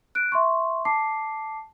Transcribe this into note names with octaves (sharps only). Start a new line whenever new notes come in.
F#6 D7
E5 C6 C#6
A5 D6 C7